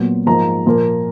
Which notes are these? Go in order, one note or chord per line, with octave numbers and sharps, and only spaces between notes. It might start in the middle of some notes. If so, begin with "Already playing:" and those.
Already playing: A#2 F#3 B3
G#2 F3 A#3 A#5
A#2 F3 A#3